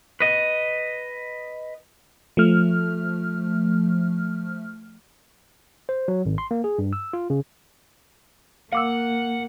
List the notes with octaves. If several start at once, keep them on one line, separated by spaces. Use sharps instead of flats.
B4 D#5
F3 A3 F6
C5
F#3
G#1
C6
A#3
G#4
G2
E6
F4
C#3
A#3 F5 F#5 D6 E6